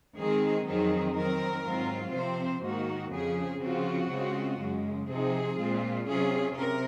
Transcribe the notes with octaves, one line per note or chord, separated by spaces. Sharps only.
D#3 G#3 C4 D#4 G#4
F2 D#3 F#3 C4 D#4 G#4
D#3 F#3 C4 A#4
G#2 F#3 C4 F4
C3 F3 C4 C5
G#2 D#3 A#3 F#4
F2 C#3 F3 G#4
C#3 F3 C4 F4 F#4
C#3 G#3 C4 F4
F#2 C#3 G#3
C3 F3 C4 D#4 G#4
A#2 G#3 C4 F4
C3 F#3 C#4 F4 G#4
C3 A#4